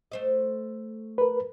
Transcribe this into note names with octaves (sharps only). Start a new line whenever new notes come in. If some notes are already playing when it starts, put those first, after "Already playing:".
A3 C5 D#5
A#4 B4